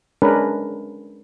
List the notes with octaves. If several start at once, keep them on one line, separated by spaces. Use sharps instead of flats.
G#3 C#4 D4 A#4 B4